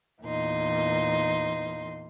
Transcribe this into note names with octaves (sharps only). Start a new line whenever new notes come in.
E2 A#2 D#4 C6